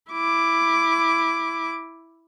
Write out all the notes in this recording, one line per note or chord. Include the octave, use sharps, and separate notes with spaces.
E4 D6